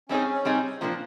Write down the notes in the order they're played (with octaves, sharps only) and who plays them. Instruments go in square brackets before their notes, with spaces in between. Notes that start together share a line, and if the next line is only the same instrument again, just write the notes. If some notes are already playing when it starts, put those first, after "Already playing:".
[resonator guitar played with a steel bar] G3 C4 D#4 G#4 [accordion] C#4
[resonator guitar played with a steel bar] G3 C4 D#4 G#4
[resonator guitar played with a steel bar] A#2 F3 A#3 D4 [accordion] C4